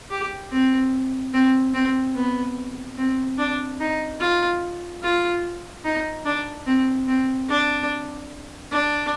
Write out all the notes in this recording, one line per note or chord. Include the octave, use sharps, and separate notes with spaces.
G4
C4
C4
C4
B3
C4
D4
D#4
F4
F4
D#4
D4
C4
C4
D4
D4